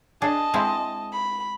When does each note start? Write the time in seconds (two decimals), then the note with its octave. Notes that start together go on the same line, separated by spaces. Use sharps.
0.22 D4 G#4 D#5 A5
0.54 G#3 C4 E4
1.12 B5